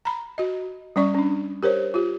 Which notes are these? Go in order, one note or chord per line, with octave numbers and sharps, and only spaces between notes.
A#5 B5
F#4 D#5
G3 C#4 D5 C#6
C#4 D4
G4 A#4 C5 C#5
F4 G4